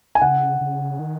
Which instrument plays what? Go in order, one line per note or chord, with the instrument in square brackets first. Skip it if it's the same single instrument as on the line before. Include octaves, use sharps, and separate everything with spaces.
[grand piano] G#5
[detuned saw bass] C#3 [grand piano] F#5
[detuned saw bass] C#3
D#3